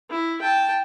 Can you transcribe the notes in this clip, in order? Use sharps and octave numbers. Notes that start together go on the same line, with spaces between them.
E4
G5 A5